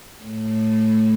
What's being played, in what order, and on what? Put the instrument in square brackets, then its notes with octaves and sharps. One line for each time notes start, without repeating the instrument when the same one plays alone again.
[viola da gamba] A2